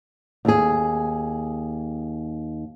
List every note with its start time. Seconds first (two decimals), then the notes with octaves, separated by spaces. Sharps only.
0.45 D#2 G#4